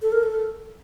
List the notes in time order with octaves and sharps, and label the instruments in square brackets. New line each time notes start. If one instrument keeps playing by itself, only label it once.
[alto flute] A4
A#4
A4